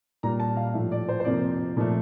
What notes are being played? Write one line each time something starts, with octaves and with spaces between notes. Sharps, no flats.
A#2 G3 A#3 A#5
A5
F5
A2 F3 A3 E5
D5
C5
C5
F2 C3 F3 A#3 D5
A#2 F3 A3